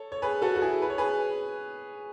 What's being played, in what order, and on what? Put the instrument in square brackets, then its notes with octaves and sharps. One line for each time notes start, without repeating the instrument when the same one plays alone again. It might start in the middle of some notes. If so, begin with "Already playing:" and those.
Already playing: [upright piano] A4 C#5
C#5
G#4 B4
F#4 A4
F#4
E4 G#4
B4
C#5
G#4 B4